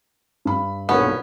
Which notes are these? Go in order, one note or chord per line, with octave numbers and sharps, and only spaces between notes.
G2 B5
B1 A#2 D3 B3 C#4